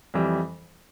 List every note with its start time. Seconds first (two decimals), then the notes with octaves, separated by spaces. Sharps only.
0.14 F2 E3 G3